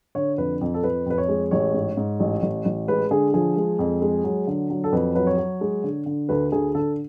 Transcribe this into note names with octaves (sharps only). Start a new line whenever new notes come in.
D3 C#5
F2 B4
F2
A4
F2 B4
F2 B4
C#5
G#3
A1 C#5
G#2
G#2
A1
A1
A1
G#3 B4
D3 G#4
F3 G#4
G#3
F2
G#3
F#3
D3
F#3
A4
F2 B4
F#3 B4
C#5
F#3
G#3
D3
D3
D2 B4
D2 G#4
D3 A4